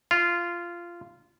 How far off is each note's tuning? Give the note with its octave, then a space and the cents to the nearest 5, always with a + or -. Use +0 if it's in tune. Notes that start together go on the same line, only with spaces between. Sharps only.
F4 -15